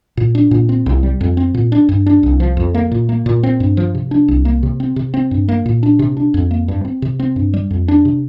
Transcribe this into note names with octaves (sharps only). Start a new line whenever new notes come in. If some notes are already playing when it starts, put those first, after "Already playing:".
A#2
D4
A#2
C4
C2
G3
F2
C4
A#2
D4
G2
D4
C2
F3
F2
A#3
A#2
A#3
A#2
C4
G2
F3
C3
D4
C2
A#3
C3
C4
C3
C4
G2
A#3
A#2
D4
C3
D4
F2
A#3
G2
C4
C3
C4
G2
G3
F2
D4
C3